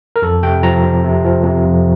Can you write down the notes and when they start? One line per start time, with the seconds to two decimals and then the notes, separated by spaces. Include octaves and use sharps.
0.16 A#4
0.22 F2 A4
0.43 C3 G5
0.63 F3 A#5
0.84 C4
1.04 C3
1.25 F3
1.44 C3
1.65 F2